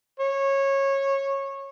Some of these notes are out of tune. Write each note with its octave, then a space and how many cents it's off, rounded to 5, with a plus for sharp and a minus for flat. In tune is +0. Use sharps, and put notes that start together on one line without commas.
C#5 -20